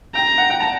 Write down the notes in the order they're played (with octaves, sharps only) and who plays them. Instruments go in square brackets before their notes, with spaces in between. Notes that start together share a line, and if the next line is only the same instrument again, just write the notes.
[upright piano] G5 [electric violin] A#5
[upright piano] F#5
G5
A5